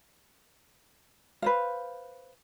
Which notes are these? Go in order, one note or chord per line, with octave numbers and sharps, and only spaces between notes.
B4 C5 F5